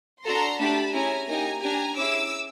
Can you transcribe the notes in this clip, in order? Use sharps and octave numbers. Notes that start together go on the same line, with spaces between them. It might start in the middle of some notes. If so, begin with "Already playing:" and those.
D4 F#4 A4 A#5 C6
A3 D4 G4 A5 B5
C#4 E4 G#4 G#5 A#5
A#3 D#4 G4 G#5 A#5
D4 G4 G#5 A#5
C#4 E4 G#4 D6 E6